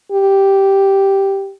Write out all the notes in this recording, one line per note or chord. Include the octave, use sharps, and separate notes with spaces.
G4